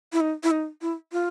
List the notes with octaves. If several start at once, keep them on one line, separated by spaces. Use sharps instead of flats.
E4
D#4
E4
D#4
E4
F4